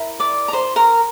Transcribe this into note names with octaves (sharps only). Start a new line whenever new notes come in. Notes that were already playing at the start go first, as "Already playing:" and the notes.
Already playing: E4 A#4
D5 D6
A#5
C5 C6
A#4 A#5